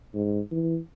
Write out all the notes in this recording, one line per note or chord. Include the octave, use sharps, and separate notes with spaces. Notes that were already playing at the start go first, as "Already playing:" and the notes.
G#2
E3